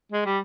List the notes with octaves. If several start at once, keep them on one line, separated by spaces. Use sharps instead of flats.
G#3
G3